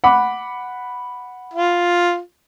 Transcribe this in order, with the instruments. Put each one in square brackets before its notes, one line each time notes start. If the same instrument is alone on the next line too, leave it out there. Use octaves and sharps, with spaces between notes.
[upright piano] F#5 B5 D6
[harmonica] F4